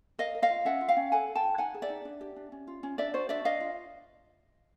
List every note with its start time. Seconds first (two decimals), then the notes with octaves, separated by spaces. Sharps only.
0.19 A#4 D#5 F5
0.35 A#4
0.42 D#5 F5
0.50 F4
0.65 C#4 E5 F#5
0.81 F4
0.89 F5 G5
0.97 C#4
1.12 A4 F#5 G#5
1.28 A4
1.35 G5 A5
1.43 F4
1.58 D#4 F#5 G#5
1.74 G#4
1.82 D5 E5
1.90 D#4
2.05 D4
2.21 G4
2.36 D4
2.52 C#4
2.67 F4
2.83 C#4
2.98 D4 D5 E5
3.14 F#4 C5 D5
3.29 D4 D5 E5
3.45 D4 D#5 F5
3.60 F4